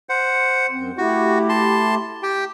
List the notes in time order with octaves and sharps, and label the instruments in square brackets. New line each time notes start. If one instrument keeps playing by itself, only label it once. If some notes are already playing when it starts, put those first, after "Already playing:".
[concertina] C5 F#5
[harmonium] F#2 C4
[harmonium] A3 E4 G4 [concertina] F#4
[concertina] A5 C6
G4 G5